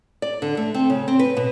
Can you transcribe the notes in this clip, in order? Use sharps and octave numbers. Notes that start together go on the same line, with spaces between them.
D5
D3
A3
C4
C#3
C4
B4
B2